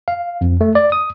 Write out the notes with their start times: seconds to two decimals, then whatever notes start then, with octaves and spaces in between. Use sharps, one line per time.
0.08 F5
0.41 F2
0.61 A3
0.75 D5
0.92 D#6